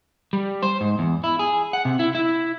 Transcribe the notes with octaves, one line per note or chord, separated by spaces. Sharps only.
G3
C5
G#2
E2
E4
G#4
F#5
C3
E4
E4